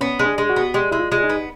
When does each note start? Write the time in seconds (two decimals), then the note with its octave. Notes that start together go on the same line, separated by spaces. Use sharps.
0.01 B3 C#4
0.19 G#3
0.26 D4
0.38 G#3
0.50 F#4
0.56 B3
0.74 G#3 G4
0.91 G#3 E4
0.99 F4
1.12 G#3
1.24 D#4
1.30 B3